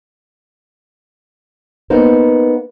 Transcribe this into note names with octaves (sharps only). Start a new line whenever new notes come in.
A#3 B3 D#4 A#4 C5